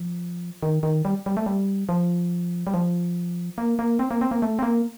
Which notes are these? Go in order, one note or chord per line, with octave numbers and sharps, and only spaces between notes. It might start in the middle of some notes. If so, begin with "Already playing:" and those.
Already playing: F3
D#3
D#3
G3
G3
A3
G3
F3
G3
F3
A#3
A#3
C4
A#3
C4
A#3
A3
C4
A#3